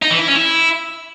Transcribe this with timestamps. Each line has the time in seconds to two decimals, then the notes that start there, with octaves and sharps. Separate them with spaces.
0.02 D#4
0.11 E3
0.19 E4
0.27 C#4
0.35 E4